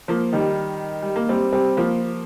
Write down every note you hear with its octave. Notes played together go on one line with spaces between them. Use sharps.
F3 A#3
D#3 G3
G3
A#3
G3 C4
G3 C4
F3 A#3